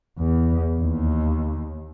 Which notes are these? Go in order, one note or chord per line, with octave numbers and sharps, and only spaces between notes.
E2
D#2